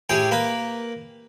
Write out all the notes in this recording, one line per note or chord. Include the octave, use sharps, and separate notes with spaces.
A2 G4 G#4 G5
A#3 B4 B5